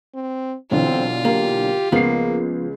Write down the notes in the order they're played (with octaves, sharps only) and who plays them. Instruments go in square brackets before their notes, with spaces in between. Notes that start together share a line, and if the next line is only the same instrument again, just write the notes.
[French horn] C4
[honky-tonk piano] B1 D3 E3 [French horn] C4 [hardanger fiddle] F4
[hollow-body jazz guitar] A#3 [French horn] G4
[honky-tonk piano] C#2 C7 [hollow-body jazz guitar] F3 B3 [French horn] A#3